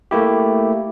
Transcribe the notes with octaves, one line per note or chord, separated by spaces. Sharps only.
A3 A#3 E4 G4